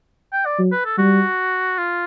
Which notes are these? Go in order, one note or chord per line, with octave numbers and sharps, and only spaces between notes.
G5
D5
F#3
B4
A4
G3 F#4
F4